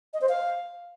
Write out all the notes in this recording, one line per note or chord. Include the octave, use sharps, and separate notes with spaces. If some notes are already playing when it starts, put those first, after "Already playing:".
D#5
C5
F5